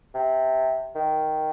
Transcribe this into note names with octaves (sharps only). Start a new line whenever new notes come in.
C3
D#3